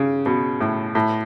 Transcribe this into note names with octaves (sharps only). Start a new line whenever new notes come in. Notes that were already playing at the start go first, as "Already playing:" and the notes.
Already playing: C#3
B2
A2
A2